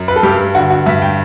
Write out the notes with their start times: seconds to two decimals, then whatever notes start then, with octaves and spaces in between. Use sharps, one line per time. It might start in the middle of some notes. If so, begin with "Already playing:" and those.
Already playing: F#2
0.08 B4
0.16 A4
0.23 G2 G4
0.55 D3 F#4
0.71 F#4
0.86 G2 E5
1.02 G5